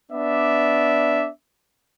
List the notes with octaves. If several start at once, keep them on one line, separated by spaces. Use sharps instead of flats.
B3 D4 D5 E5